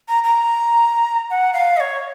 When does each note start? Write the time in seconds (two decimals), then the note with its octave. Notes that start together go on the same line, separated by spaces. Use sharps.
0.08 A#5
0.24 A#5
1.30 F#5
1.53 F5
1.77 D#5
1.80 C#5